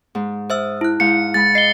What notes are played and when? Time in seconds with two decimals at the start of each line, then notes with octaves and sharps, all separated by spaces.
0.15 G#2
0.50 C5 E5 D#6 E6
0.81 E4 F#6
1.00 G#2 F5 G6 C#7
1.34 G#3 B5 A6
1.55 D#5 C7 G7